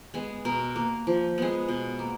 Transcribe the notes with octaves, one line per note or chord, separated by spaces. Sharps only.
G#3 B3
B2 A#4
A#3
F3
G#3 B3
B2
A#3